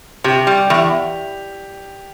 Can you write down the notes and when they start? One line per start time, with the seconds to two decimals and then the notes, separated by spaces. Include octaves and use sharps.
0.24 C3 G4
0.47 G3
0.70 E2